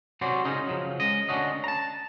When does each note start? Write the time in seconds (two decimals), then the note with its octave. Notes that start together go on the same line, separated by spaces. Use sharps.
0.21 C3 F#3 C#4 F#4 C5 D5
0.45 C#3 C#4 D#4
0.66 C#3 F3 F#3
1.00 G#3 D#5
1.29 D2 D3 C#4 D4 F#4 D#5
1.64 A5 A#5